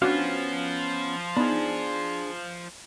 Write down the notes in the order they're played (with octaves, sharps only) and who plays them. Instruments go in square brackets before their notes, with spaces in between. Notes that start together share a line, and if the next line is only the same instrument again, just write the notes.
[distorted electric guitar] F3 F4 [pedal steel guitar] B3 C#4 F5 [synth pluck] D4 F#4
[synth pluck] B3 D#4 [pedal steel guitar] D4 G#4